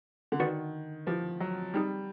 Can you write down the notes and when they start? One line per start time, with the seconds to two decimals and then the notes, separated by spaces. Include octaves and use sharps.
0.32 D3
0.40 D#3 F#4 B4 D5 F#5
1.07 F3 E4 G4 B4
1.40 F#3
1.74 G3 C4 D#4 G#4